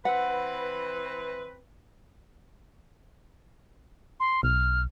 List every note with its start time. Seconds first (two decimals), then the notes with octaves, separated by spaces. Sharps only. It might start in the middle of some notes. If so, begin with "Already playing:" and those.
0.05 E3 C4 B4 F#5
4.20 C6
4.43 B1 F6